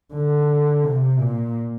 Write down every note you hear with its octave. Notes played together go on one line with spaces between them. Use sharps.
D3
C3
A#2